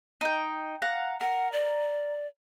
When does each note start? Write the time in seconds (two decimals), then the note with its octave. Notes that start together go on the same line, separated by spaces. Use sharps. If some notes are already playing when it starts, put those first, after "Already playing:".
0.21 D#4 G5
0.82 F5 F#5 A#5
1.21 A#4 F#5
1.52 D5